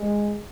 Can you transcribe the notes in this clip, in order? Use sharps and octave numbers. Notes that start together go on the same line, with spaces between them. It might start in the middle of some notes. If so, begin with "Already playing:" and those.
Already playing: G#3